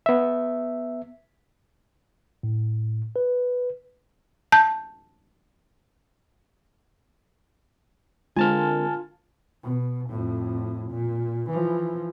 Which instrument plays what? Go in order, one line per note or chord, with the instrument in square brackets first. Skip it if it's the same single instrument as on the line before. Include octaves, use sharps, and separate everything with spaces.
[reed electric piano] B3 E5
[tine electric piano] A2
B4
[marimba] A5 G6
[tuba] D3 [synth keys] G#3 C4 A#4 [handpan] F4 [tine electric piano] G#5 A5 F6
[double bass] B2
F2 A2
A#2
E3 F3